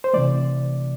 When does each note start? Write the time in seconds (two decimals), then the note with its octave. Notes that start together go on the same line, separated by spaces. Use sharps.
0.04 C5
0.13 C3 E3 A3 D5